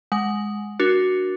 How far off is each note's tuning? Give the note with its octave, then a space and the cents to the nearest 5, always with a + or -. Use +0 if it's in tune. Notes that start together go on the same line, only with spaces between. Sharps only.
G#3 +0 F#5 +0
D4 +0 F#4 +0 A#4 +20